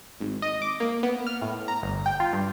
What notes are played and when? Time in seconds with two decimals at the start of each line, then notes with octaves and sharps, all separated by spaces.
0.20 G#1
0.42 D#5
0.62 D6
0.80 A#3
1.03 B3
1.27 F6
1.42 A2
1.68 A#5
1.83 G1
2.06 G5
2.20 F4
2.33 G2